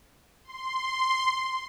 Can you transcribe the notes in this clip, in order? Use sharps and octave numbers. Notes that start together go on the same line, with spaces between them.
C6